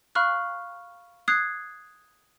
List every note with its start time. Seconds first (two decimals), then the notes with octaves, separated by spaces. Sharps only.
0.15 F5 B5 C#6 F6 F#6
1.28 D#6 F#6 G#6 C7